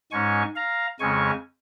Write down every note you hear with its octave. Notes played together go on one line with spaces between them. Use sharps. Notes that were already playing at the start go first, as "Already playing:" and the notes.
G#2 G#3 C#4 G#5 C#6
F5 A#5
F2 C#3 G#3 C#4 G#5 C#6